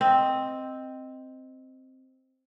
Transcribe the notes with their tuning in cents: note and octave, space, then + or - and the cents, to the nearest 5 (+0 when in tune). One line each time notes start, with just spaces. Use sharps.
C4 +0 D#5 +0